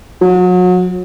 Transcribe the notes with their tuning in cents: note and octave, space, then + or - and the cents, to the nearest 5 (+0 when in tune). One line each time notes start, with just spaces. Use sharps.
F#3 -35